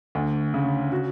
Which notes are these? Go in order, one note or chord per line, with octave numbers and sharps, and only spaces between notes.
D2
C#3
F#4